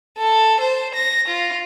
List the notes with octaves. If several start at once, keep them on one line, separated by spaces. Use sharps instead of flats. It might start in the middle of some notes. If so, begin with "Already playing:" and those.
A4
C5
A#6
F4